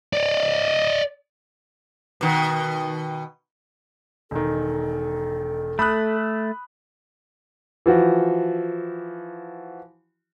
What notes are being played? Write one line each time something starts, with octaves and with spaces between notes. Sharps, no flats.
D5 D#5
B2 D#3
E1 D#3 A4
A3 B5 D#6 F#6
E3 F3 F#4